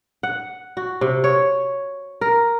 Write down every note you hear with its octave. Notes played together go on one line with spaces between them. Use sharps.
F#5
F#4
C3
C#5
A#4